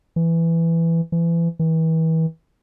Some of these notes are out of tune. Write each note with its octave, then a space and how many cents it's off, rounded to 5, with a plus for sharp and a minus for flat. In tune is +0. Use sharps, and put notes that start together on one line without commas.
E3 +10
E3 +30
E3 -35